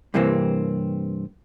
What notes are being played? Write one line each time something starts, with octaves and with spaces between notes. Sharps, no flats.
G2 C3 E3 A#3 C4